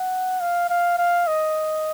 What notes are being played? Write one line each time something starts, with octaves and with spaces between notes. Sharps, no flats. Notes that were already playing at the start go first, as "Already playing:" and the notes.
Already playing: F#5
F5
F5
F5
D#5